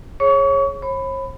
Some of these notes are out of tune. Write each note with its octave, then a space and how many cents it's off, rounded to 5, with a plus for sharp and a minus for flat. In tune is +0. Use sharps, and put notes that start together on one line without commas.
G#4 +0 C#5 -15 C#6 +35
C#5 -45 B5 +15